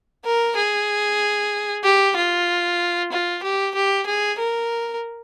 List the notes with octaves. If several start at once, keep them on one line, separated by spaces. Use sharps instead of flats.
A#4
G#4
G4
F4
F4
G4
G4
G#4
A#4